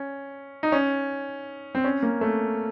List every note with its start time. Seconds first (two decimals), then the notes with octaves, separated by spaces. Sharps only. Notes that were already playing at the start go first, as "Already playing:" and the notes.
Already playing: C#4
0.63 D#4
0.72 C#4
1.75 C4
1.84 C#4
2.03 A#3
2.21 A3